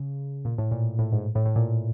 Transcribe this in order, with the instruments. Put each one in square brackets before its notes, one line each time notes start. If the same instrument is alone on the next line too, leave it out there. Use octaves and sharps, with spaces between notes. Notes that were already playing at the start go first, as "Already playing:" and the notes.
Already playing: [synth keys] C#3
A#2
A2
A#2
A2
G#2
A2
A2
A#2